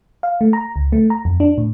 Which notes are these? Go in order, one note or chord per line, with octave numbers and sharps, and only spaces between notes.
F5
A3
A#5
C#2
A3
A#5
F2
D4
A2